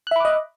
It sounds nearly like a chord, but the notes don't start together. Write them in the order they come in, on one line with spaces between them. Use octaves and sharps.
F#6 E5 B5 D6 D#5